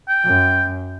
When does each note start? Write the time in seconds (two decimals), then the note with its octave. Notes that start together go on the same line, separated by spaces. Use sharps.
0.09 G5
0.25 F#2